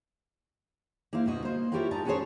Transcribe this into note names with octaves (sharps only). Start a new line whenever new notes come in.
A#3 E4 C5 F5
D2 B2 F#4 D#5
A#3 C5
E4 F4 G4 A#4 C#5 F#5
G#2 D#4 A5 A#5
C#4 F#4 G#4 A4 C5 C#5